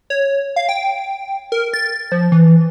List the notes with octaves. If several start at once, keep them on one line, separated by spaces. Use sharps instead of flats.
C#5
F5
G5
A#4
A6
F3
E3